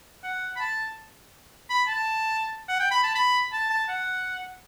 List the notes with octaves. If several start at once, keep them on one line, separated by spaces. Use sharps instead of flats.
F#5
B5
A5
B5
A5
F#5
G5
B5
A5
B5
A5
A5
F#5